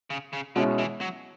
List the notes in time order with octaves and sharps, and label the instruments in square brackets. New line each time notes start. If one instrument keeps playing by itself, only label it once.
[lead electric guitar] C#3
C#3
[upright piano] B2 G#3 C#4 E4 [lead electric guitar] D3
[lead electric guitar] E3
F#3